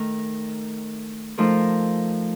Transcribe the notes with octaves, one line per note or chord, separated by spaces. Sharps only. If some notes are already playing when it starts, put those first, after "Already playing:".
Already playing: D#3 A3 D#4 A#4
F3 A3 D#4 A#4